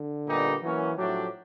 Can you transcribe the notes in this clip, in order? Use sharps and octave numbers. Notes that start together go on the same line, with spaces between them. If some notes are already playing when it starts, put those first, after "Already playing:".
Already playing: D3
A#2 G3 B3 D#4 G4
E3 F#3 A#3 C#4
A2 F3 F#3 A3 D4 G4